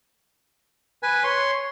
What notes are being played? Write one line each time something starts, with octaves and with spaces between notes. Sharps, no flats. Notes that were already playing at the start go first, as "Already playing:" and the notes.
B4 G#5
C#5 C6